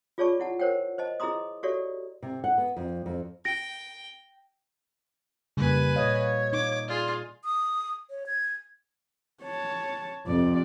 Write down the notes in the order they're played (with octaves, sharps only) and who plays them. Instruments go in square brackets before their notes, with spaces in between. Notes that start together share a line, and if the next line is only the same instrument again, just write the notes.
[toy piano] F4 G#4 C#5 D5 A5 C#6
E4 F#5 A5
A#4 C5 C#5 F#5 G5
C5 D#5 A5
E4 G#4 D#5 A#5 C6 D#6
F#4 G4 A4 C#5 D5 E5
[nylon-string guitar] C3
F#5
B3
F2
F2
[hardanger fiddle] G5 [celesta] A#6 D7
[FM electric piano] F2 C#3 [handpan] G3 A#3 [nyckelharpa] B4 G#5
[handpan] A#2 D#5 [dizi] C#5 [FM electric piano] F5
[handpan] D#4 [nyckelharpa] D6
[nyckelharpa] F4 G#4 [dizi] D5
[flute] D#6
C#5
G#6
[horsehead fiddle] C#5 A5
[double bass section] F2 C3 [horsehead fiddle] D5